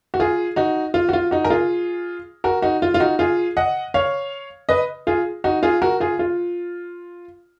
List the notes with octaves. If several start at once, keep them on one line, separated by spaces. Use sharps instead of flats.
F#4
F4 G#4
D#4 F#4
F4
F#4
F4
D#4 F#4
A#4
F4 G#4
F#4 A#4
D#4 F#4
F4
F4
D#4 F#4
F4 G#4
D#5 F#5
C#5 F5
B4 D#5
F4 G#4
D#4 F#4
F4 G#4
F#4 A#4
F4 G#4
F4